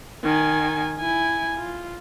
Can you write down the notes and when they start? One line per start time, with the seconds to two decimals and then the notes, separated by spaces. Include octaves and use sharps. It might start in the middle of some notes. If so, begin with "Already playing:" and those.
0.24 D#3 G#5
1.00 E4 G#5
1.57 F4